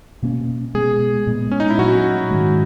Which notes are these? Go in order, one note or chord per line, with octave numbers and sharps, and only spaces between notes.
B2 A#3 C#4
B2 G#3 B3 G#4
A#2 G#3 B3
C#4
D#4
E4
A#2 F#3 C#4 F#4
G#2 D#3 G#3